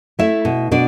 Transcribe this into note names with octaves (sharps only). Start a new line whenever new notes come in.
A3 E4 E5
B2
B2 D4 D5